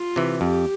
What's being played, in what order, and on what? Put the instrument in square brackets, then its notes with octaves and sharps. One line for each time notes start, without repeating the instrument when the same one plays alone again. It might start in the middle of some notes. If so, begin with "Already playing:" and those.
Already playing: [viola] F4
[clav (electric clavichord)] C3 E3
[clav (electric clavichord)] F2 [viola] G4